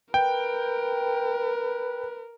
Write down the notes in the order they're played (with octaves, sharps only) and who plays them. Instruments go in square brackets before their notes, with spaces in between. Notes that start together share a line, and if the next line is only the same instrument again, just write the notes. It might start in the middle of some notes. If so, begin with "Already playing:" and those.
[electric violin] A#4 [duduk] B4 [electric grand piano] G5